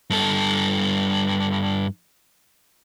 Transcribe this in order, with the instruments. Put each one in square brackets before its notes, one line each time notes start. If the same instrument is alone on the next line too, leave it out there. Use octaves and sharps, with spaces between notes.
[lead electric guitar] G2 A4